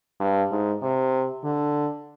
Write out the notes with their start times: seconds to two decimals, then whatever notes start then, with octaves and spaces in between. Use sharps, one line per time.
0.20 G2
0.51 G#2
0.82 C3
1.44 D3